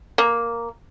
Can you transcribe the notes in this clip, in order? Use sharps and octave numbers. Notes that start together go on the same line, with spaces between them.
A#3